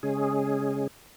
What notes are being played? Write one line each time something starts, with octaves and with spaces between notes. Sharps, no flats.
C#3 G#3 C#4 G#4